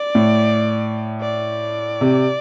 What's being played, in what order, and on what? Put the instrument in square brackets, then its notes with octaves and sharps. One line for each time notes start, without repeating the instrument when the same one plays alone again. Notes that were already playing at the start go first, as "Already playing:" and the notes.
Already playing: [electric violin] D5
[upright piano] A2
[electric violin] D5
[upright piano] C3